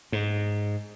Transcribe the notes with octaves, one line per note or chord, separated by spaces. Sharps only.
G#2